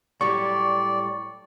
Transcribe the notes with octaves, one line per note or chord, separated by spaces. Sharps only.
A2 F#3 G3 D5 C#6